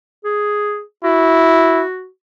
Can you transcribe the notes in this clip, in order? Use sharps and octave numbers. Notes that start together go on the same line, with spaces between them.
G#4
E4 F#4